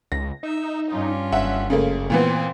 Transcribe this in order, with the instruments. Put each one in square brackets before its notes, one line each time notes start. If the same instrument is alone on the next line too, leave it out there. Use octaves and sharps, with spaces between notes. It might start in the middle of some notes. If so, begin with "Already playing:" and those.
[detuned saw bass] C#2 [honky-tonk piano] A#6
[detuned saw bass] D#4 [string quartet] E5
[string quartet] G2 C#4 F4
[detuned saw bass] F#1 [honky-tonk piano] E5 F#5
[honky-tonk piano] C#3 A3 A#3
[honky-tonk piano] A#2 E3 B3 [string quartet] C4